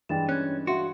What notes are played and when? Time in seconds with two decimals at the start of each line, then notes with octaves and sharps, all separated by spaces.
0.09 G2 E3 G#3 G5 A6 E7
0.29 C#4 F#6 G#6
0.67 F#4 E5 F5 C6